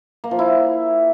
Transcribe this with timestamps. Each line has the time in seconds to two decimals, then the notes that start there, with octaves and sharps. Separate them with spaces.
0.24 A#3
0.31 F3
0.39 E4